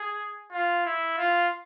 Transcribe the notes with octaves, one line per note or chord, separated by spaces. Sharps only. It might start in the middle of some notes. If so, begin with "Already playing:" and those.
Already playing: G#4
F4
E4
F4